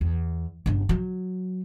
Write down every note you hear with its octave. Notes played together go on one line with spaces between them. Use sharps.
E2
G1 C#3
F#3